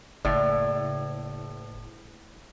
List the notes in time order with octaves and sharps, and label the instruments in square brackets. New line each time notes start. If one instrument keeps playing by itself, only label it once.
[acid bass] F#1 [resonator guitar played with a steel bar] A2 D5